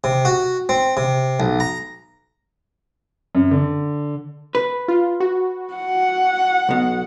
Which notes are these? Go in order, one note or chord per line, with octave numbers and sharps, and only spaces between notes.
C3
F#4
C4
C3
B1
A#5
F#2
D3
B4
F4
F#4
F#5
B1 B2